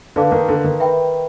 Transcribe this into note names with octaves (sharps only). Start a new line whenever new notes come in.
D3 B4 D5 F5 A5 D6
D#3
D3
D#3
B4 E5 G5 B5